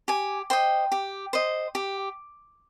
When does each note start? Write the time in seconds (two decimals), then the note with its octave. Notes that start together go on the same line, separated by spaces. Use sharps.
0.08 G4 G#5
0.50 C5 D#5 G5
0.92 G4
1.33 C5 D#5
1.75 G4